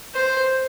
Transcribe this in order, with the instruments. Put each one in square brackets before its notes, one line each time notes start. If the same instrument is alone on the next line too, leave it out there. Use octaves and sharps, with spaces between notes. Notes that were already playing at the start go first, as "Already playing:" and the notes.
[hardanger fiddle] C5